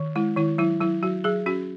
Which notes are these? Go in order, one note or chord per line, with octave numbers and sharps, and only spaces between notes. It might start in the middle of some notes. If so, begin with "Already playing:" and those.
Already playing: D#3
G#3 E4
D#3 E4
F#3 E4
F#3 E4
F#3 F#4
F#3 G#4
C#4 F#4